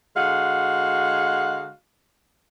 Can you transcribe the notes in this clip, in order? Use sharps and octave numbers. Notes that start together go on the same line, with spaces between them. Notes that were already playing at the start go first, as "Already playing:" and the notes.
D3 G#3 F#4 F5 F#5